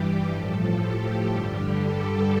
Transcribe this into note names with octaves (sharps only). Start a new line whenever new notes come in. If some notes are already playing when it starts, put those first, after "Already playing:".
Already playing: G2 E3 G3 G4
A2 F3 A4
G4
G2 D3 G3
A4